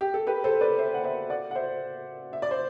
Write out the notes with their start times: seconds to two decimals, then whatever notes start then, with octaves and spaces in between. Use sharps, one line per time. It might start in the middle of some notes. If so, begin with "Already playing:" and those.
0.01 G4
0.14 A4
0.27 G4 B4
0.44 A4 C5
0.61 B4 D5
0.78 C5 E5
0.94 F#5
1.04 C5 E5
1.30 D5 F#5
1.51 F#5
1.55 C5 E5
2.33 E5
2.42 D5
2.51 C5